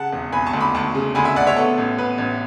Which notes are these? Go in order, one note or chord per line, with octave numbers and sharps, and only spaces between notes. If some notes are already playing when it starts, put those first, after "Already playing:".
Already playing: C#3 F#5 A5
E1
E1 G#5 B5
A5 C#6
D2
B5 D6
D2 A5 C#6
C#3
D2 G#5 B5
E5 G#5
D2 D5 F#5
C#5 E5
B3 A4
A1
B3 B4
A1